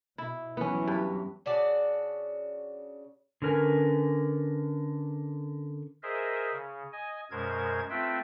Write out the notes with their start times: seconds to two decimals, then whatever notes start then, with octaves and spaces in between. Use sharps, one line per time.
0.18 B2 E4
0.57 E3 F#3 B3 C#4
0.88 G2 B4
1.46 C#3 D4 F#4 D5
3.42 D3 C#4 A#4 B4 G#5
6.03 G#4 A#4 C5 D#5 E5
6.53 C#3
6.93 D#5 G#5
7.31 F#2 B2 G#3 A#4 C5 G#6
7.90 A3 C4 F4 B4 E5 G5